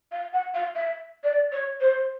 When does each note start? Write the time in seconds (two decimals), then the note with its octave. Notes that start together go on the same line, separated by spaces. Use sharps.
0.11 F5
0.32 F#5
0.54 F5
0.75 E5
1.23 D5
1.51 C#5
1.80 C5